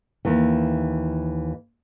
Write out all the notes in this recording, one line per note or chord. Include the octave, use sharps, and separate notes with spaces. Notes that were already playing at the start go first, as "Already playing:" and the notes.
D#2 E3